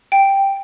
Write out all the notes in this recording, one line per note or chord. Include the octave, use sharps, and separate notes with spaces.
G5